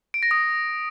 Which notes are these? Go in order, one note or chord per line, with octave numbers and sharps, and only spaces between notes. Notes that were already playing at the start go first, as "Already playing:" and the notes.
D7
A#6
D#6